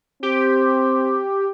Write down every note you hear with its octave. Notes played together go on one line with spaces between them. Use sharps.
C4 G4